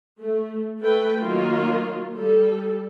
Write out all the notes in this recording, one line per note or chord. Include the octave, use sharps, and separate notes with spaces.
A3
A3 A4 B4 G5
D#3 F#3 A#3 F4
G3 A4